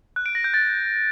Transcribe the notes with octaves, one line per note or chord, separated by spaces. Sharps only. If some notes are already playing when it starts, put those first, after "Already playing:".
F#6
D7
A#6
G6
A6